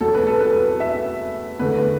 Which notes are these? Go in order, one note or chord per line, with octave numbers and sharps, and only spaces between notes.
E2 B2 F#3 A4
B4
A4
B4
E5
E2 D3 A3 B4